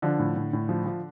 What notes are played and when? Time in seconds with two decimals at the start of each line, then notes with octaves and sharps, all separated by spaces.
0.02 D3 F3 D4
0.19 A2
0.36 A2
0.53 A2
0.69 F3
0.86 F3